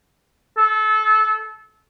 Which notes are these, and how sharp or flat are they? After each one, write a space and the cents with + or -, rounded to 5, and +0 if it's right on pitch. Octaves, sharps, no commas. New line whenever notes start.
A4 -25